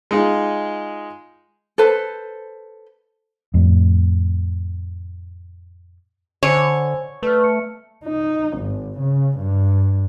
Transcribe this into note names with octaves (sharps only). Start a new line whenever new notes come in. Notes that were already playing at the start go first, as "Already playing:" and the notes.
G#3 D#4 F4 G#4
A4 B4 C5
F2 A2
D3 C5 C#5 G#5 E6
A3 B4 D5 F6
C#7
D#4
G#1
C#3
G2